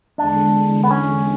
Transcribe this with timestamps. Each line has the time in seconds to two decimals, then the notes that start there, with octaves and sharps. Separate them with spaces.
0.18 E2 D3 G#3 D4
0.84 B3
0.91 C#4